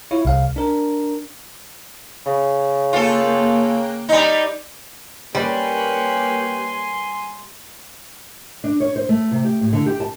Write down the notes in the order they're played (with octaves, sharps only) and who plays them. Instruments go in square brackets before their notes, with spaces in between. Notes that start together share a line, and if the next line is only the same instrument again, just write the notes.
[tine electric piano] E4 F4 C#5
C2 F5
D4 A#4
[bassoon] C#3
[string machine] A#3 G5 F#6 [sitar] F4 A4
[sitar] G3 D#4
[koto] G3 [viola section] A#3 C#4 B4 [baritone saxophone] G4 [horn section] G#5 C6
[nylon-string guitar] D4
C#5
C5
A3
C3
G4
A2
D3
G4
A5